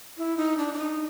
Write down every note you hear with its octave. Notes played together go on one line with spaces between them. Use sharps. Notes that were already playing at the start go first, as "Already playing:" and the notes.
E4
D#4
D4
D4
D#4